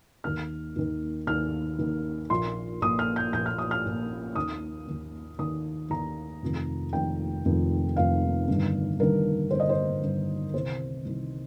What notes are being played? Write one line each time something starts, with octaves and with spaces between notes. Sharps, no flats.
D#2 D#3 F6
D#2 D#3
D#2 D#3 F6
D#2 D#3
A#1 A#2 C6
A#1 A#2 D#6
F6
G6
A#1 A#2 G6
F6
D#6
F6
A#1 A#2
D#2 D#3 D#6
D#2 D#3
D#2 D#3 D#6
D#2 D#3 A#5
F1 F2 D#3
F1 F2 D#3 G5
F1 F2 D#3
F1 F2 D#3 F5
G1 G2 D#3
G1 G2 D#3 A#4
G1 G2 D#3 C5
D#5
C5
G1 G2 D#3
C2 C3 D#3 C5
C2 C3 D#3